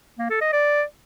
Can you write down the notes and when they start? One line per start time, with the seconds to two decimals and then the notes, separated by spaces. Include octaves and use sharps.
0.18 A#3
0.30 A4
0.41 D#5
0.53 D5